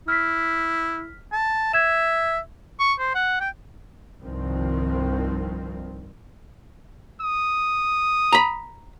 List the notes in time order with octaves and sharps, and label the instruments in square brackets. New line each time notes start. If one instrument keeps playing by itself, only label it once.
[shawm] E4 [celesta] F6 B6
[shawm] A5
[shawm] E5 [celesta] G#6 E7
[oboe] C#6
C5
F#5
G5
[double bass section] C2 G2 D#3 F3 C4
[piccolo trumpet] D#6
[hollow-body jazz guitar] A#5 B5